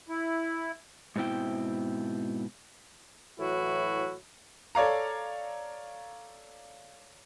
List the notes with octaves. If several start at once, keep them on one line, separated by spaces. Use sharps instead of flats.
E4
G#2 B2 C4 E4 G5
A2 E3 F#3 E4 F#4
A4 C#5 D5 F5 A#5